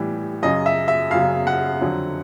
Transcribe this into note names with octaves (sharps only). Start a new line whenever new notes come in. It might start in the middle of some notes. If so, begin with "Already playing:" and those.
Already playing: A2 E3 G3
F#2 C#3 F#3 D#5
E5
E5
F#2 C#3 F#3 F5
F#5
F2 D3 F#3